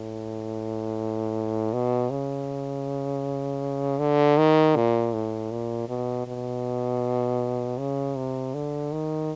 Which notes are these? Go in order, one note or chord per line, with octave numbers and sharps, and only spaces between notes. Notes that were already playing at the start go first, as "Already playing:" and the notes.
Already playing: A2
B2
C#3
D3
D#3
A#2
A2
A#2
B2
B2
C#3
C3
D3
D#3